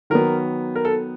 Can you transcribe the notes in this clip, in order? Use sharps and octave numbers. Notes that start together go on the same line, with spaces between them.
D#3 F#3 B3 A#4
A#4
A4